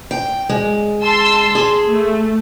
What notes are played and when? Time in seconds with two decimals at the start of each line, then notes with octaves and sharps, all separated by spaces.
0.11 G5
0.49 G#3
1.03 A5 C6 E6
1.55 G#4
1.87 A3